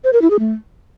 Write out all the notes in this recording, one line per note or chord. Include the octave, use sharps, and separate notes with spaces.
C5
A#4
E4
G#4
A3